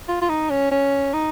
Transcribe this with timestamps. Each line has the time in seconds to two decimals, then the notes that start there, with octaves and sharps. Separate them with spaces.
0.09 F4
0.22 F4
0.29 D#4
0.50 C#4
0.71 C#4
1.13 D#4